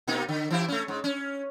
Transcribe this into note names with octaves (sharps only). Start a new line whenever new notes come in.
B2 A#3 D#4
D3
E3 E4 G4
A3 C#4
G#2
C#4